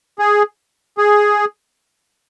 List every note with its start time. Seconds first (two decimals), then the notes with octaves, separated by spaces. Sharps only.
0.19 G#4
0.98 G#4